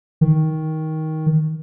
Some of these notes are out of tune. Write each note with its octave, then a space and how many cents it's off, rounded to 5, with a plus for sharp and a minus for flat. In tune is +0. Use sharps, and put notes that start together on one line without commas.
D#3 +15